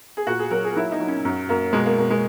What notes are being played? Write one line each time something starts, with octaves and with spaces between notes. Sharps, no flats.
G#4
A#2 F#4
G#4
F#3 A#4
G#4
F#3 E4
D#4
F#3
C#4
F#2
F#2 A#3
B2 G#3
A#3
B2 A#3
G#3